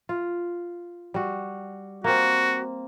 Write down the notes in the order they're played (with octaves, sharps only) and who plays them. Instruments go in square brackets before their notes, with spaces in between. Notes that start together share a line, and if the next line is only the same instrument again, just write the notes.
[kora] F4
G3 F#4
[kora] A#3 C4 [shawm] F#4